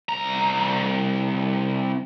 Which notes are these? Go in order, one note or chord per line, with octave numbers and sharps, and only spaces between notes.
C2 A#5